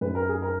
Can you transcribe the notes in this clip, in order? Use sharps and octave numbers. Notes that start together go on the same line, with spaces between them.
F#2 B4
A#4
G#4
A#4